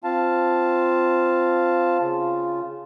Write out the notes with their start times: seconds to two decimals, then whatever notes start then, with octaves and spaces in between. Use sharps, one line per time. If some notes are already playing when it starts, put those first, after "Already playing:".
0.04 C4 F4 F5 A5
2.00 C#3 F4